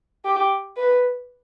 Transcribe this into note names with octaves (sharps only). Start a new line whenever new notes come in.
G4
B4